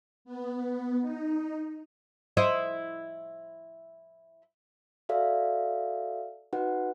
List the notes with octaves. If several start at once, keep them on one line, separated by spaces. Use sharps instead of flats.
B3
D#4
E4 C5 D#5
F#4 A4 D5 E5 F5
D#4 F#4 B4 F#5